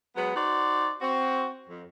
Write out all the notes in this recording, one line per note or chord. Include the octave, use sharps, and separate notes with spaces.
F#3 G#3 B3
D#4 F#4 C5 D5
C4 F#4
F2